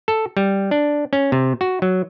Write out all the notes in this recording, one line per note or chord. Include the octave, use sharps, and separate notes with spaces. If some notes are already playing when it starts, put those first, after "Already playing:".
A4
G3
D4
C#4
C3
F#4
F#3